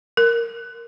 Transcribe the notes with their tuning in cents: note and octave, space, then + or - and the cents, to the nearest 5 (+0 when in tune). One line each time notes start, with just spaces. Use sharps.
A#4 -5